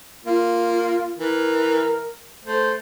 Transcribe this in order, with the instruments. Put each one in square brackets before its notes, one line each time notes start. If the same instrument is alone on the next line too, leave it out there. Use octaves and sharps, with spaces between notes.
[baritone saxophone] A#3 [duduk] F4
[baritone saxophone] E3 [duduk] A#4
[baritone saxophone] A3 [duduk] C5